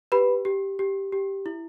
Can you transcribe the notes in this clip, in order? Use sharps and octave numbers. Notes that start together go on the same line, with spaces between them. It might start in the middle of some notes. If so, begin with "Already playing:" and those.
G4 B4 B5
G4
G4
G4
E4